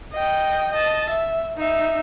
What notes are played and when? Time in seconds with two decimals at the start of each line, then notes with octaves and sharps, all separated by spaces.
0.13 D#5 G5
0.73 D#5 A5
1.10 E5
1.57 D#4 E5